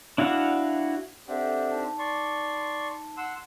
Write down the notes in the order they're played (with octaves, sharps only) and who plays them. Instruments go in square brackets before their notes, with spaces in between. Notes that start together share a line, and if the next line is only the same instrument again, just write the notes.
[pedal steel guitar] D4 E4 F#4 F5 F#5
[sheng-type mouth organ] C4 D4 G4 [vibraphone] A4 E5 F#5
[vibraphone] D#4 A5
[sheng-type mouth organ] D5 C6 C#6
F#5 C6 E6